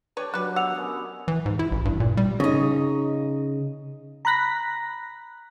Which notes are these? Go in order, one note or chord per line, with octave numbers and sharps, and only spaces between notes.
D4 G4 B4 C#5 D5
F#3 G3 B4 F#6
B2 F#5 E6 F7
B3 C#4 A#4
E3
G#2
E4
A1
G2
A#2
G3
C#3 D#4
A#5 B5 F#6 A#6 B6